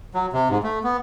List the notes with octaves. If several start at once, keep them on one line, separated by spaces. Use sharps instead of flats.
F#3
C3
G#2
A3
B3